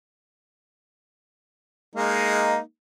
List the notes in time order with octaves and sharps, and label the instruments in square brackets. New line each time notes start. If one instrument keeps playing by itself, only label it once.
[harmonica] G#3 A#3 D#4